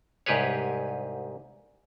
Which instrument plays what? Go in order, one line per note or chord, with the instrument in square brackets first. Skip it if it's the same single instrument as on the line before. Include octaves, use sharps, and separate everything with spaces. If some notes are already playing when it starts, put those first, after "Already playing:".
[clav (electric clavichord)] C2 G#2 G4 G#4 B4 C#5